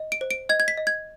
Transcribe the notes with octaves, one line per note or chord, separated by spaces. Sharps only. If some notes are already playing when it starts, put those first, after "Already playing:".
Already playing: D#5
D7
C5
D7
D#5 G#6
G#6
B6
D#5
G#6